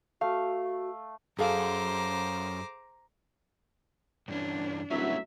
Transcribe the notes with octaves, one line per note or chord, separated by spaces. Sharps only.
A3 F#4 F5
F#2 G#4 A4 C5 F5 A#5 D6
G2 E3 C#4 D4
D1 F#3 G3 A3 C#4 E5